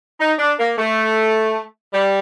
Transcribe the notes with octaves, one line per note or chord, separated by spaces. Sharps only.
D#4
D4
A#3
A3
G3